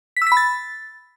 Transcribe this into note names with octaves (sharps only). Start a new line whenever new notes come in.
B6
E6
B6
B5
A6